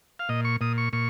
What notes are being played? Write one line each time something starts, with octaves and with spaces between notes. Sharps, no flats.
F5
A#2 D#5
C#6
A#2 D#6
C#6
A#2 C#6